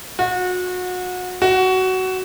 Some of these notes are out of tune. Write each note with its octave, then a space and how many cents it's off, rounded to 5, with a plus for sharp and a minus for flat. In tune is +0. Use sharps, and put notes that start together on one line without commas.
F#4 -30
F#4 +15